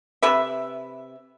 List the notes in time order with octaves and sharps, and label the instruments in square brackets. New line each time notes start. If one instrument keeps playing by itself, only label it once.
[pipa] C3 B4 E5